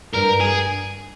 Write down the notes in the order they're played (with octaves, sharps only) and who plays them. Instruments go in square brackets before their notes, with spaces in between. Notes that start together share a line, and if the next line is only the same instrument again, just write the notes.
[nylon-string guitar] G2 [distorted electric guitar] A#4
[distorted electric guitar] G#4